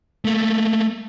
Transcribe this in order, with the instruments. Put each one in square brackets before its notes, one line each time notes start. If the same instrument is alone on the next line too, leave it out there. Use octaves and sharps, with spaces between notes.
[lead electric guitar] A3 A#3